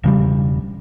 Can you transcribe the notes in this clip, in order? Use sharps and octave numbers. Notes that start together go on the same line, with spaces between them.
E1 C#3 G3